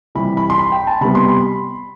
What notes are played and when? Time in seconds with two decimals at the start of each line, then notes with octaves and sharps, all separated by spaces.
0.15 C3 E3 G3 B5
0.37 B5
0.50 C6
0.58 B5
0.72 G5
0.87 A5
1.01 C3 G3 B3 B5
1.15 C6
1.28 B5